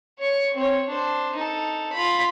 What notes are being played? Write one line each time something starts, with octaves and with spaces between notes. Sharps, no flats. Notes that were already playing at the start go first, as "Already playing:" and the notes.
C#5 C#6
C4 C#5
D4 C5
D#4 A4
F4 B5